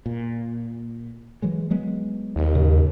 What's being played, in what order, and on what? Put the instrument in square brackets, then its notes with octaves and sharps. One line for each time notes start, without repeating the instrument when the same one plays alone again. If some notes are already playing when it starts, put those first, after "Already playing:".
[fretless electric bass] A#2
E3 F#3 G#3
F#3 G#3 B3
[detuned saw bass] D#2
[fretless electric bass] G#2 C#3